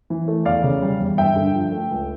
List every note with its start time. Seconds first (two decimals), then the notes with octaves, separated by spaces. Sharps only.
0.10 E3
0.28 A3
0.45 E2 D5 F5
0.63 C#3
0.82 G3
1.00 E2
1.18 G2 E5 G5
1.36 D3
1.55 F3
1.72 A3
1.91 C#2